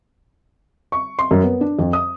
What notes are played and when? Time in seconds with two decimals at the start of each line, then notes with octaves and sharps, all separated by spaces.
0.92 C#6
1.19 C6
1.31 F#2
1.43 B3
1.61 D4
1.79 F2
1.93 D#6